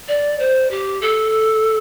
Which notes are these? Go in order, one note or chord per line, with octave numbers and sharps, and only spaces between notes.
D5
C5
G4
A4